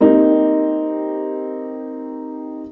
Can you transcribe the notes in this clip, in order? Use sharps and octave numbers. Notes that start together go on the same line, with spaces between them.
A#3 C4 D#4 G4